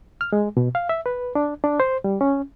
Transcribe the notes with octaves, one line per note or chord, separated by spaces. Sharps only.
F6
G#3
B2
F5
E5
B4
D4
D4
C5
G3
C#4